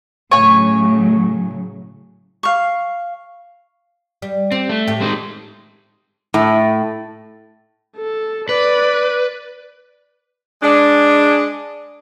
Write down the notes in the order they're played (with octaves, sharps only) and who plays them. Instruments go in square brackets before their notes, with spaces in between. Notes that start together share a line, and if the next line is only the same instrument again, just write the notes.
[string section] A2 C#3 F#3 [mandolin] C#5 G#5
[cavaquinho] F5 C#6
[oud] G3
[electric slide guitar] C4 [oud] G4
[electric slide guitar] A3
[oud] A2 G4
[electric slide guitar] G#3 C4 D#4
[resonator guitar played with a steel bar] A2
[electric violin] A4
[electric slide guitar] B4 [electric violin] D5
[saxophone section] G#3 D4